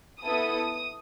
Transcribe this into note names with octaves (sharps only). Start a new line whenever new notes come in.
B3 E4 A4 D#6